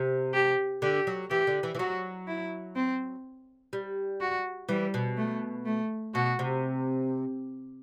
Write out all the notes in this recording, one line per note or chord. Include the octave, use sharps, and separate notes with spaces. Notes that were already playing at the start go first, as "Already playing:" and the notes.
Already playing: C3
G4
D3 G4
F#3
E3 G4
D3
E3
E3
F#3 F#4
E4
C4
G3
F#4
E3 G3
B2
A3
A3
B2 F#4
C3